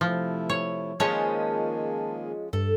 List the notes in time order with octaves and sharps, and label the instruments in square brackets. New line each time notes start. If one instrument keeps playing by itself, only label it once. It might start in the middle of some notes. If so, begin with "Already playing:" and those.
[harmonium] C3 A3 E4 [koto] F3
[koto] C#5
[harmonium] D#3 A#3 G#4 [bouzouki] F3 G#3 C#4 [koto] C#5 [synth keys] A5
[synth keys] G2 [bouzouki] A4